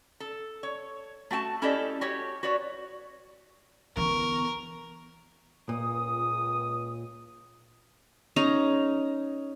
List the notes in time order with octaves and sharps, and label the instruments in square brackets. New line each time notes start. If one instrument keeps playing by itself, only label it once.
[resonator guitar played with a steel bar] A4
C#5
A3 F#4 G5 A5
C#4 E4 G4 A4 D5 D#5
F#4 G4 C#5
F#4 B4 C#5 D5
[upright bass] D3 B3 [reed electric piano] E3 [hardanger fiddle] A#4 [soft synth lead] C#6
[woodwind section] C#2 D#6 [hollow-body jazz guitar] A#2
[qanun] C#4 D#4 G#4 A#5